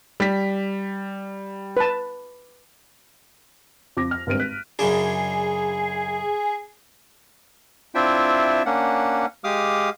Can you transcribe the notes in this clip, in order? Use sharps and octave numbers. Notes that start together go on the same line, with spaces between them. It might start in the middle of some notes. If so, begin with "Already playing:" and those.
G3 B6
B4 A5
F2 D6 A#6
F6
G#1 G2 C4 D7 D#7
F#6 B6
F#2 C#3 D4 G#4
C4 D4 E4 F4 E5 G5
A#3 C#4 D4 F#5
G#3 G4 F5 D6 D#6 F6